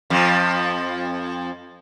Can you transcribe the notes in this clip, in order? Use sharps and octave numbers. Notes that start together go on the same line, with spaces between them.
F2 F3